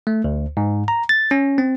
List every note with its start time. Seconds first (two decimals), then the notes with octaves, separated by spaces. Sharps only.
0.07 A3
0.24 D2
0.57 G#2
0.88 A#5
1.09 A6
1.31 C#4
1.58 C4